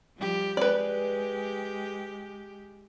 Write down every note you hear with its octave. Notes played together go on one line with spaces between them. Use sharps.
F3 G3 G4
G#3 G4 B4 D5